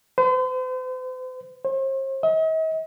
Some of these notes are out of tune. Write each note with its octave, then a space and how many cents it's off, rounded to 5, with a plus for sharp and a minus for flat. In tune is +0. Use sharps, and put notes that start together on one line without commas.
C5 -45
C5 +40
D#5 +45